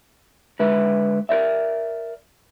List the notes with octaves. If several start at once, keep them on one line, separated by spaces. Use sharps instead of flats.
D3 G#3 B4 E5
A#4 C5 D5 E5